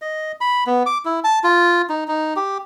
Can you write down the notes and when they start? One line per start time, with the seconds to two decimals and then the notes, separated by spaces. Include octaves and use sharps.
0.02 D#5
0.41 B5
0.67 B3
0.86 D6
1.05 E4
1.24 A5
1.44 F4
1.89 D#4
2.08 D#4
2.36 G4